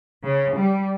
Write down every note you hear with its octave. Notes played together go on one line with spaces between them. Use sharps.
C#3
G3